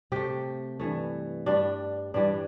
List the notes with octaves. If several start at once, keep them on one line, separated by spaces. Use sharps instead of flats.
C3 A3 G4
G2 E3 A3
G2 G3 D4
G2 E3 G3 D4